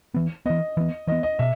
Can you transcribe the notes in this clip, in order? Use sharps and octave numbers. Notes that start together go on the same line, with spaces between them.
E3 B3
E3 B3 D#5
E3 B3
E3 B3 D#5
D#5
B2 E5